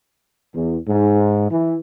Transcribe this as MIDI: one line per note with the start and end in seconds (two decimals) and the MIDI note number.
0.54 0.77 40
0.88 1.49 44
1.49 1.76 52